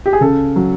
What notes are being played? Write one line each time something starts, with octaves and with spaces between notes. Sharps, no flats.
G4
G#4
C#3 A4
F#3